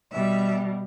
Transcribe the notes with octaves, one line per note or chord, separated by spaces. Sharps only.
B2 G3 E5